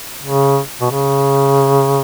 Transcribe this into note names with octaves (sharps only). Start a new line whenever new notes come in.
C#3
B2
C#3